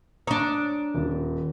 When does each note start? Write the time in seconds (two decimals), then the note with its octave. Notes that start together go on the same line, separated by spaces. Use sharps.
0.27 D4 C#5 A#5 D#6
0.94 D#1